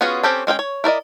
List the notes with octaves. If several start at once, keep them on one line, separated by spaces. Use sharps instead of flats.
B3 C#4 F4 F#4 G#4
C4 C#4 G4 A4
G#3 C#4 G#4 G5
C#5
E4 A#4 D5 D#5